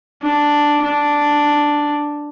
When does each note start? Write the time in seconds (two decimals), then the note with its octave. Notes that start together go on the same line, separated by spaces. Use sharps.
0.22 D4
0.82 D4